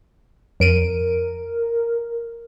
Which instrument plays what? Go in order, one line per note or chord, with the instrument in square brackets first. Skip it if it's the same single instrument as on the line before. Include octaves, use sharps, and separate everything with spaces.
[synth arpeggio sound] F2 D7 D#7 [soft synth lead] A#4